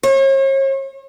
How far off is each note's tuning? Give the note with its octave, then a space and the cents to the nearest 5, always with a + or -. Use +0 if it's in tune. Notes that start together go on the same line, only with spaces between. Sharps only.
C#5 -40